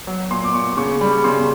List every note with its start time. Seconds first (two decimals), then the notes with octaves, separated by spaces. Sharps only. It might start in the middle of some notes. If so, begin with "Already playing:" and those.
0.07 F#3
0.30 A#2 C6
0.44 D6
0.54 A#2 C#6
0.77 C#3 C#6
1.01 G3 B5
1.24 C#3 C6